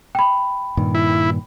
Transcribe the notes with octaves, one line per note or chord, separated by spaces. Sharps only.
G5 B5
G2 A#2 D#3
E4